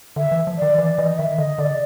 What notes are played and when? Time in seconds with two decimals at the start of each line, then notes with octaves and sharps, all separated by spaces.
0.16 D3 E5
0.32 E3
0.47 F3
0.58 D#3 D5
0.78 E3 D5
0.98 E3 D#5
1.18 D#3 E5
1.38 D3 D#5
1.58 D3 D5
1.70 C#3